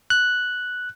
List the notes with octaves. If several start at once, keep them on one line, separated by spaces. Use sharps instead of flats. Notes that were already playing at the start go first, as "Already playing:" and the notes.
F#6